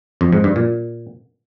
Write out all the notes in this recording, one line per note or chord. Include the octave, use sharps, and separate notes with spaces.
F2
G#2
G2
A#2